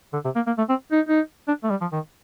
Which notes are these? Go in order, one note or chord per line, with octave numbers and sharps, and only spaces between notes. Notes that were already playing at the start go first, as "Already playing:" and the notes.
D3
C3
A#3
A#3
A3
C4
D#4
D#4
D4
A3
G3
F3
D#3